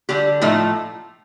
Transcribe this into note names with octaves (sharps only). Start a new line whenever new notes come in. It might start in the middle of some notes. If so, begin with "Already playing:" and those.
D3 G3 G4
A2 F3 A3 D#4